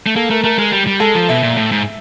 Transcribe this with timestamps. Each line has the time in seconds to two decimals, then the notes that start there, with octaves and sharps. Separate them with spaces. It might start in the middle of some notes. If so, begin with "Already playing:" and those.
0.06 A3
0.16 A#3 A4
0.30 A3 A#4
0.44 A3 A#4
0.59 G#3 A#4
0.72 G3
0.87 G3
1.00 G#3 A4
1.15 F3
1.29 B2 E5
1.43 A#2
1.57 A2
1.72 G#2